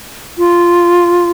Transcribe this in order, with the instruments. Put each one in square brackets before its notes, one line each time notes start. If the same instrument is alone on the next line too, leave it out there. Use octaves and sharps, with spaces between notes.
[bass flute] F4